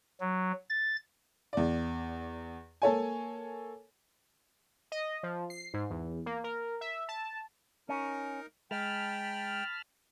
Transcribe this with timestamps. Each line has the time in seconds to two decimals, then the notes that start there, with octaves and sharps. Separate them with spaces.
0.20 F#3
0.69 A6
1.53 E2 D5
2.82 A#3 A4 C#5 G#5
4.92 D#5
5.23 F3
5.50 C7
5.74 G#2
5.90 E2
6.26 A#3
6.44 A#4
6.81 E5
7.09 A5
7.89 C#4 D#4 A#4
8.71 G#3 G5 A5 B5 F6